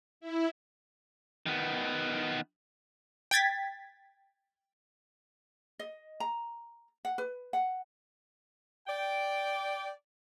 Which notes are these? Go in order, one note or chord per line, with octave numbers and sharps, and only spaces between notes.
E4
D#3 B3
G5 G#6 A6 B6
D#5
A#5
F#5
B4
F#5
D5 G5